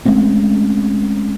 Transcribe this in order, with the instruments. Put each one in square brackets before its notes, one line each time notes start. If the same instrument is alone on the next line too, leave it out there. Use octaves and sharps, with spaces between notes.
[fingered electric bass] G#3 A3 C4 C#4